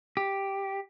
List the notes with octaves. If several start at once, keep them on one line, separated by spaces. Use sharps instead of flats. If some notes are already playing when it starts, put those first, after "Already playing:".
G4